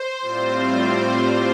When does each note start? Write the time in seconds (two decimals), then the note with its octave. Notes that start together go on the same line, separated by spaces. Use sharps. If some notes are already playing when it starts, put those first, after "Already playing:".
Already playing: C5
0.20 A2 G3 C4 F4